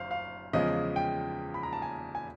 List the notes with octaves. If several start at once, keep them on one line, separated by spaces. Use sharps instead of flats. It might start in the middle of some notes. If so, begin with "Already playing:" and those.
Already playing: F#1 F#2 C5 F5
F5
E2 C#3 F3 G#3 D#5
G5
B5
A#5
A5
G#5
G#5